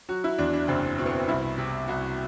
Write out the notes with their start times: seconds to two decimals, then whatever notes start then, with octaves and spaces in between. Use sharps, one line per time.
0.09 F#3 F#4
0.24 E4
0.38 E2 D4
0.53 D4
0.68 F#1 C4
0.98 B2 C4
1.06 B3
1.13 C4
1.28 C2 E4
1.58 C3
1.88 C2 F#4